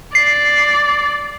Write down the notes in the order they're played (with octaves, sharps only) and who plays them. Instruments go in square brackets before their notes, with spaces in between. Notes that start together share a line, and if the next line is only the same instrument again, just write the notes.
[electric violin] D5 [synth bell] C7